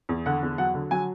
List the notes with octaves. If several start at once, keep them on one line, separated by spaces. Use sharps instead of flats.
E2
D3 F#5
E2
F#3 F#5
D3
F#3 G#5